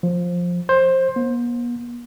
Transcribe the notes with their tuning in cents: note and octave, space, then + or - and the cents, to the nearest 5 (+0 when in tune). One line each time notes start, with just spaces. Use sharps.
F3 +10
C5 +15
B3 -45